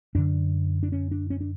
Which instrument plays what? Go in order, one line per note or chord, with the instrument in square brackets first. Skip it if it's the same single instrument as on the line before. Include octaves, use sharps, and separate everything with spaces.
[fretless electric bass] F#2 D3 D4
D4
C#4
D4
C#4
D4